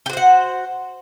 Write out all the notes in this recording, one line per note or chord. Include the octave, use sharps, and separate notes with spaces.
F#4 G4 C5 F#5